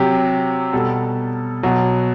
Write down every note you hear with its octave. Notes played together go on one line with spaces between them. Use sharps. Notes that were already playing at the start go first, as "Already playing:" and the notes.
Already playing: C3 F#3 G4
B2 G3 A4
B2 F#3